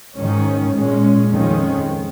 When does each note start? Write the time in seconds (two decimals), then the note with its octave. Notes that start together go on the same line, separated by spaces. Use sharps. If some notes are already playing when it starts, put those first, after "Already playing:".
0.16 G#2 D#3 C#4
0.74 A#2 G#3 C#4
1.32 F2 D#3 G#3 C#4